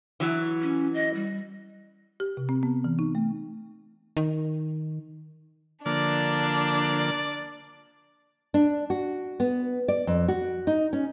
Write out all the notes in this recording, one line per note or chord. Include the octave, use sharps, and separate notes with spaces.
E3 F#3
C#4
D#5
G3
G4
C3
C4
B3
E3
D#4
A3
D#3
D3 F3 A#3 D4 D5
D4
F#4
B3
D5
F2
F#4
D#4
C#4